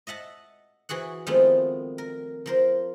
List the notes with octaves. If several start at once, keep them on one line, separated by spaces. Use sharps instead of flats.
D#5 E5 F#5 A5
E3 F#4 G#4 F#5
D#3 F3 G#3 A3 B3 C4
A#4
F3 A#4 C5